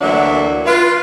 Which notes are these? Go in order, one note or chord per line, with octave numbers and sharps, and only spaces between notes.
D2 E3 F#3 A#3 D4 E5
F4 B4